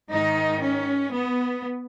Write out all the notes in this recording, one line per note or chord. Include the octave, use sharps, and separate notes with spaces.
G#2 D#3 D#4
C#4
B3